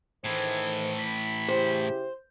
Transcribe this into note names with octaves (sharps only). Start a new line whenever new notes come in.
A2 D#3 E3 A3 G#4 C5
B5
C#3 E4 G4 C5